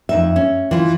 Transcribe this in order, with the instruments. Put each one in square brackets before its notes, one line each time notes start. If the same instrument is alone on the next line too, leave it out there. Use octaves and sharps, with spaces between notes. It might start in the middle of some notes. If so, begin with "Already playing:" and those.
[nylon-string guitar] F2 D#4 E5
C#4
E3 F4